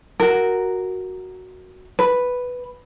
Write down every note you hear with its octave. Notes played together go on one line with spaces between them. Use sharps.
F#4 A#4
B4